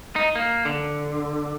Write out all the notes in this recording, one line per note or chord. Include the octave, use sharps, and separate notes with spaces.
D#4
A#3
D3